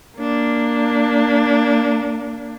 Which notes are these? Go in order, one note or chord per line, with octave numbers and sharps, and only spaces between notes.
A#3 D4